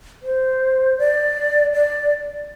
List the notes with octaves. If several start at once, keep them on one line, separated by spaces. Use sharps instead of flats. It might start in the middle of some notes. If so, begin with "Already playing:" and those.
C5
D5
D5